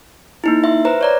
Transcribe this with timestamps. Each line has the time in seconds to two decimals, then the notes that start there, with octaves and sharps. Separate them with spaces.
0.44 A#3 D#4 E4
0.64 E5 C6
0.85 B4 C5 A#5
1.01 C#5 D5 A#5